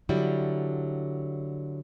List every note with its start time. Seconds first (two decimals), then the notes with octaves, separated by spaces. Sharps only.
0.09 D3 F#3 G3 E4